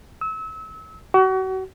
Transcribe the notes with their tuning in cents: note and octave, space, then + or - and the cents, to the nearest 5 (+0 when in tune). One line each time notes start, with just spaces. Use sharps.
E6 -30
F#4 +35